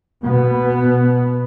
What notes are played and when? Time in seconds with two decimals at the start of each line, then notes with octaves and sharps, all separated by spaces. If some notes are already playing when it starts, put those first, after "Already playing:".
0.24 B2 B3